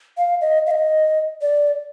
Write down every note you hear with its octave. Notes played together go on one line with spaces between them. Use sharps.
F5
D#5
F5
D#5
D5